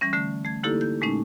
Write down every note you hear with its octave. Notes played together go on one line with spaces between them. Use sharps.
E3 G3 C#4
D3 A3
A3 G#6
D3 A#3 D#4 E4 G4 A4
G6
A#2 G#3 A3 C#4 D#4